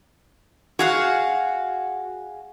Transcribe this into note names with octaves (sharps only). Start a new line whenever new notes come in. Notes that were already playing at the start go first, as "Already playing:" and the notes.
F#4 G#4 F5 F#5